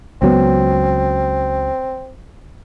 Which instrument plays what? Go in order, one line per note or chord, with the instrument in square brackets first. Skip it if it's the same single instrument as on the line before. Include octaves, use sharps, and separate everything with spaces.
[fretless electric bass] C#2 F#3 B3 [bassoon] C4